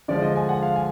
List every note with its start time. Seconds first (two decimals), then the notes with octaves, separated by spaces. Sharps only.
0.08 D3 F3 G#3 D5
0.22 D#5
0.36 G#5
0.49 F#5
0.63 F5
0.76 G#5